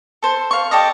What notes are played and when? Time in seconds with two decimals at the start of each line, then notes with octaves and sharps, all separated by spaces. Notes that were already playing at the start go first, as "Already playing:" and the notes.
0.23 A4 C5
0.51 F5 C#6
0.71 G4 A4 D5 D#5